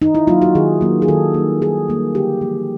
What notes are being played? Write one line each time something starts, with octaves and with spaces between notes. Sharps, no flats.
D#3 D#4
E4
F#3 A#3 F4
F#4
D#3 G#4
F#3 A#3
G#4
D#3 A4
G3 A#3
D#3 G#4
G3 A#3
D3 G4
F3 A#3